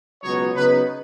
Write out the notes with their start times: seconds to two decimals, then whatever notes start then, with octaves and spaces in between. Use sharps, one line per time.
0.23 C#2 B2 F#3 B3 D#4 C#5
0.55 C#3 F#3 B3 D#4 B4